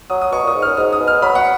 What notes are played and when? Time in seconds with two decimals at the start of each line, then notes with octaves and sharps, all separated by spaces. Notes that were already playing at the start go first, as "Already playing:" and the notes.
0.10 F#3 D#6
0.21 D#6
0.32 B2 C#6
0.43 A#2 D#6
0.55 G#2
0.62 F6
0.66 F#2
0.77 G#2 D#6
0.92 D#6
1.00 B2
1.07 F6
1.22 F#3 B5
1.35 F#3 F#5